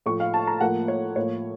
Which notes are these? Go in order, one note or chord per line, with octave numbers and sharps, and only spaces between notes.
A2 F3 A3 C#6
F5
A5
A#5
A2 F3 A#3 F#5
C#5
A2 F3 A#3 C#5